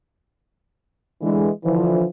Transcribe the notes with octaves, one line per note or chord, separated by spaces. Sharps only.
D3 E3 G#3
D3 E3 F3